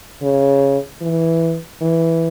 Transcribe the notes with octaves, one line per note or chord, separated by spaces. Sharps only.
C#3
E3
E3